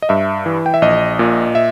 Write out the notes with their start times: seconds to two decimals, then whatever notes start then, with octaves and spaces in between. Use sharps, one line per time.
0.02 D#5
0.09 G2 E5
0.46 E3
0.66 G5
0.74 E5
0.82 A#1 D#5
1.19 A#2
1.55 E5